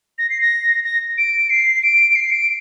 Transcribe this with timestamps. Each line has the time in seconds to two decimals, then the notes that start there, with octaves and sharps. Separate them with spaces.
0.18 A#6
0.30 C7
0.41 A#6
0.84 A#6
1.18 D7
1.50 C7
1.83 D7
2.15 C7
2.32 D7